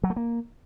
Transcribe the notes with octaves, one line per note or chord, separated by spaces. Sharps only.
F#3
A3
A#3